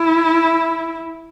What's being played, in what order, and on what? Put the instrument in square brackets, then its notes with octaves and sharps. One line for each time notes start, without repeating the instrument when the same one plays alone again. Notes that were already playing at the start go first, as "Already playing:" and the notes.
Already playing: [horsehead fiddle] E4